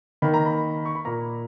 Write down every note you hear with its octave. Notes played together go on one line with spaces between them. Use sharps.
D#3 A#3 B5
A#5
B5
C#6
B5
A#2 A#3 A#5